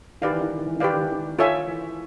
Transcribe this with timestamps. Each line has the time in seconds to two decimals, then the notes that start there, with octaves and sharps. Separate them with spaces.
0.22 D#3 G4 B4 D5 F5
0.31 E3
0.40 D#3
0.48 E3
0.58 D#3
0.66 E3
0.76 D#3
0.80 E3 G4 B4 D5 F5
0.93 D#3
1.02 E3
1.12 D#3
1.38 D#3 F4 A4 C#5 E5 G#5
1.67 E3